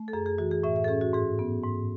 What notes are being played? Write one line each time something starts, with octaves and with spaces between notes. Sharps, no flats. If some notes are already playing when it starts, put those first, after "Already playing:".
Already playing: A3
A4
F#2 G#4
G#4
E3 F#4
G#4
A2 E5
E5
A4
C#4 G#4
F#4
G#2 G#4
B3
G#2